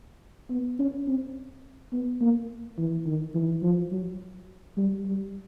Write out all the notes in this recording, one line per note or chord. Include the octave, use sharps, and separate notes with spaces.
B3
C#4
C4
B3
A#3
E3
D#3
E3
F3
F#3
G3
G3